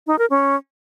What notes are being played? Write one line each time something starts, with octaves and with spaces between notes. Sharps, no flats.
D#4
A#4
C#4